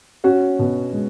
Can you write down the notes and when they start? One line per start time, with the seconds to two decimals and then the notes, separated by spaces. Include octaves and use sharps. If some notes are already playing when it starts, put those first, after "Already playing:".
0.24 C#4 F#4
0.59 B2
0.93 G#3